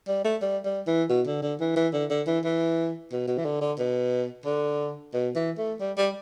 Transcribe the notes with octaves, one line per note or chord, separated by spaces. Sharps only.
G3
A3
G3
G3
E3
B2
D3
D3
E3
E3
D3
D3
E3
E3
B2
B2
E3
D3
D3
B2
D3
B2
E3
A3
G3
G3